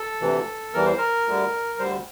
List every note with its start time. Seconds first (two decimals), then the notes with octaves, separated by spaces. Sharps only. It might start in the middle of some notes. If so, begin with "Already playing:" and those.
Already playing: A4
0.21 D2 C3 E3
0.73 E2 E3 G3 A#4
0.86 C5
0.98 A#4
1.26 D2 D3 G3
1.79 D2 D3 G3 C5